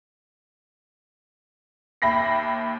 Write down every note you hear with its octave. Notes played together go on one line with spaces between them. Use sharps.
D#2 E5 G5 B5 A#6 C7